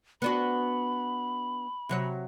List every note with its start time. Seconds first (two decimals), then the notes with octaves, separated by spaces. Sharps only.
0.22 B3 D4 F#4 B5
1.89 C3 F#3 C#5